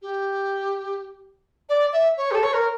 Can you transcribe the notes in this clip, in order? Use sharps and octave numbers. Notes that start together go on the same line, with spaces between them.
G4
D5
E5
C#5
G4
A4
C#5
A#4